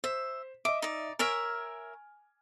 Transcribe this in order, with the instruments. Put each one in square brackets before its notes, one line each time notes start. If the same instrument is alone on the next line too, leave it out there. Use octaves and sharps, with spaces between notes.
[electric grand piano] C5 [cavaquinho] E5
[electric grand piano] D#5 E5 [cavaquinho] D6
[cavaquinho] D#4 D5
[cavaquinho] A#4 C#5 E5 [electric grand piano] G#5 F6 D7